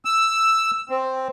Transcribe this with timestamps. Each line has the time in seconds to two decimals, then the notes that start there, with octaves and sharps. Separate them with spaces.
0.05 E6
0.89 C4